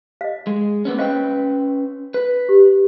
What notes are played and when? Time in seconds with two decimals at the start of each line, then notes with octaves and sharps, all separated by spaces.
0.21 D#5 F5
0.47 G#3
0.85 A#3 B3 C#4
0.98 C#4 B4 C5 D#5 F5 G5
2.14 B4
2.49 G4